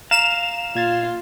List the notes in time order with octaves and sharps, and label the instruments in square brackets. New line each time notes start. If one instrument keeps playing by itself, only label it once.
[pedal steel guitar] F5 [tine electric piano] A#5 [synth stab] E7
[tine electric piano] A#2 G#6 A6 [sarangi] F4